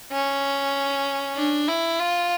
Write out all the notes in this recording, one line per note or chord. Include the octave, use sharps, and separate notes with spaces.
C#4
D4
E4
F4